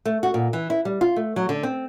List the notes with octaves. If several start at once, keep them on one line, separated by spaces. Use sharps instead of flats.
A3
F#4
A#2
E3
E4
G3
F4
A3
F#3
D3
C4